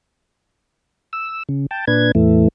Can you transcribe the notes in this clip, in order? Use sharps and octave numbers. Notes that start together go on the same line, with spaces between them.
E6
C#3
G5 A5
A#2 D4 B4 G#6
E2 A2 E3 A3